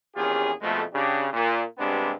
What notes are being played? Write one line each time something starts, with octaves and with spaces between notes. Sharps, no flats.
A#1 E2 C#4 F4 G4 G#4
F2 B2 F3 G#3 A3
C#3 D4 G4
A#2
G2 C3 G#3 B3 C4 D4